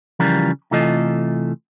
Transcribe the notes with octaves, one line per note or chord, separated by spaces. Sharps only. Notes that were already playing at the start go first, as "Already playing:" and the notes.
C#3 E3 F3 G3 F4 A#4
C3 E3 A3 F4 A4 D#5